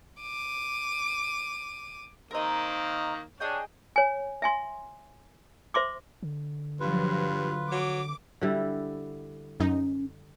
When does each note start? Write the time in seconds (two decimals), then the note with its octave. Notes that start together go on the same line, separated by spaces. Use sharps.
0.21 D6 D#7
2.31 D#3 A#3 C4 A#4 D#5
3.40 D4 G#4 C#5 D#5 G5
3.96 C#5 G#5
4.42 E5 G#5 C6
5.74 C5 E5 C6 D6
6.23 D3
6.80 G2 F3 F#3 F4 B4
7.71 F#3 D6
8.41 D3 G3 E4
9.60 F#2 C#4 D#4